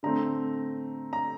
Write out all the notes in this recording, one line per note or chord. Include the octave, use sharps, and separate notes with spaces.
D3 A3 C4 A#5
A#5